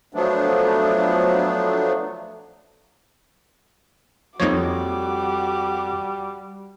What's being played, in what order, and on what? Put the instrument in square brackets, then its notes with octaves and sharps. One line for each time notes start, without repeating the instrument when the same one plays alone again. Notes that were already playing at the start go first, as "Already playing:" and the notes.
[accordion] F3 F#3 A3 B3 D4
[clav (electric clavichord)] F2 C#5 [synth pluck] F3 A#3 D#4 [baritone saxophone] G3 [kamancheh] F#4 D6